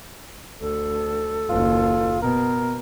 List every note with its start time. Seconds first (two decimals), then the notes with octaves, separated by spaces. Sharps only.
0.61 D2 A4
1.49 F#1 D#2 F4
2.22 B2 B3 A#4